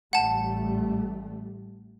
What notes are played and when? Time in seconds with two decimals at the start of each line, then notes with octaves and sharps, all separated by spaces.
0.13 A1 G3 A3 F#5 A5